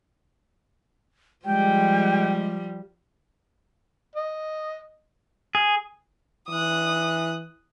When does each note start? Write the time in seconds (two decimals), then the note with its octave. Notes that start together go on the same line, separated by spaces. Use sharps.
1.46 F3 G3 G#3 G5
4.16 D#5
5.55 G#4
6.50 E3 D#6 F#6